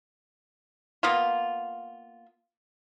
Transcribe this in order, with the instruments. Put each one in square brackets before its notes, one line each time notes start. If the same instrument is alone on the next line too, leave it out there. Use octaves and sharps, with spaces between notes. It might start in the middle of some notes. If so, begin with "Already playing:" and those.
[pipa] A#3 B3 F4